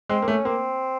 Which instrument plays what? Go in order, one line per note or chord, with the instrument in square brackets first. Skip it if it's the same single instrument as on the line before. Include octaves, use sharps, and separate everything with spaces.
[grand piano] G#3 [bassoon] C4
[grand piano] A#3
[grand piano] A3 [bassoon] C#4
[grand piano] A#3 [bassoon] C4